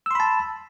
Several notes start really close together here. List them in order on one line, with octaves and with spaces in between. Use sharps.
E6 C6 B5 A5